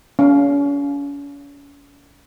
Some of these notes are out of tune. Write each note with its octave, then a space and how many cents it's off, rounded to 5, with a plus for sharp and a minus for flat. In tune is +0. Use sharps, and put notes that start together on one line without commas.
C#4 +40 F5 +0